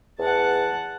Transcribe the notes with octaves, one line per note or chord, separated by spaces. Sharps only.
E2 F#5 A5